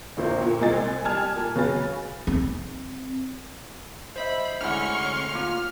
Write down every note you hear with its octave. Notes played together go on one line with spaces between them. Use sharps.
A1 D2 A#2 C5
A#2
C2 G#3 C4 G#5 A6
G3 G#5 A5 F6 G#6
A#2
C#3 F#3 B4 G#5 A6
C4
C5 D#5 E5 B5
D2 D3 G#3 C#4 E4 F#5 C#6 F6
A#3 F4